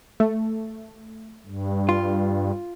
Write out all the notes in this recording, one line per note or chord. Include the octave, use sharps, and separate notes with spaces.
A3
G2
F4